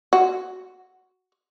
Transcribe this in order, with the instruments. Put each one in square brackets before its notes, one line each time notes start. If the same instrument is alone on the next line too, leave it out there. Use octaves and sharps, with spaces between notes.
[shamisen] F#4